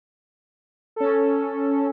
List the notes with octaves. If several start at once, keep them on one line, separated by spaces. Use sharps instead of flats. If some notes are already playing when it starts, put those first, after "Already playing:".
C#4 A4